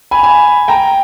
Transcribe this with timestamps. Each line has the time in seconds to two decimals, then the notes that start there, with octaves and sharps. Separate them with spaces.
0.11 G#5 B5
0.23 G#5 B5
0.68 G5 A#5